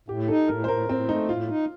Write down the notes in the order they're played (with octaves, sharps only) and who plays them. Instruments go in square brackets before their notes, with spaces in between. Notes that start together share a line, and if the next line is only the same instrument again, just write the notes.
[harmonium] A2 [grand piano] G4
[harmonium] D#4 [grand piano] A4
[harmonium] A2 [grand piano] A#4
[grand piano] C5
[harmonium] A2 [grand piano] A#4
[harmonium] A2 [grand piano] C4
[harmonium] A3 [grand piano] D#4
[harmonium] A2 [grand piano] F4
[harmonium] D#4